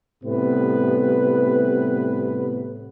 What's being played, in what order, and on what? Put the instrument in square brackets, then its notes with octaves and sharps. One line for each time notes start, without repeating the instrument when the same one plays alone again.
[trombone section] A2 C3 G3 B3 B4